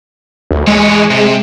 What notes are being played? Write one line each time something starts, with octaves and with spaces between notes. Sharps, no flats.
D2
E3 G#3 C#5
C3